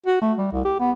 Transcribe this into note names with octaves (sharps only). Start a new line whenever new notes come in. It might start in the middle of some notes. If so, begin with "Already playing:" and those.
F#4
A3
G3
C2
G4
B3